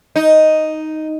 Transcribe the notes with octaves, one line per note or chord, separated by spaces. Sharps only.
D#4